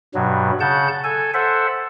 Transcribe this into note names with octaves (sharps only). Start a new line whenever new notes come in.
G2 B2 F#3
C#3 F#5 A5 G6
A4 G#5
A4 C5 E5 F#5